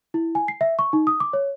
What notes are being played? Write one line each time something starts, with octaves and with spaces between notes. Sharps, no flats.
E4
G#5
C7
E5
C#6
D#4
D#6
D6
C#5